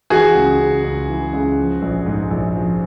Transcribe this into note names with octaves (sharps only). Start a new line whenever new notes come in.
E3 F#4 G#4
C#2
C#3
C#2
E3
C#2
F3
A#1
G#2
A#1
F3